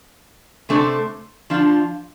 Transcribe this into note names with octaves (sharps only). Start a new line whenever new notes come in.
C3 A3 D4 A4 C5
F3 D4 F4